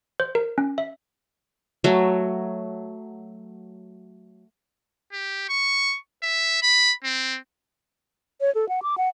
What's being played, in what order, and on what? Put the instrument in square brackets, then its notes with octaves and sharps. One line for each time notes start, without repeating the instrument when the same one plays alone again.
[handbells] C5
A#4
C#4
E5
[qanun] F#3 A3
[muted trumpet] G4
C#6
E5
B5
C4
[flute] C#5
A4
F#5
D6
F#5